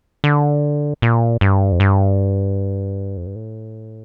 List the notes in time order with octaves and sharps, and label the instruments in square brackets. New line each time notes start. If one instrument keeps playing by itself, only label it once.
[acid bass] D3
A#2
G2
F2
G2
F2
G2
A2